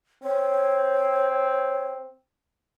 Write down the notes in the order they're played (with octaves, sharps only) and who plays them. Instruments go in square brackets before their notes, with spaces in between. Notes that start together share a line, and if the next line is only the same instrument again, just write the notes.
[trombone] C4 [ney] C#5